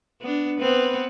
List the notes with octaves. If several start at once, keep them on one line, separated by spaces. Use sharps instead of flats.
B3 D4
B3 C4 B4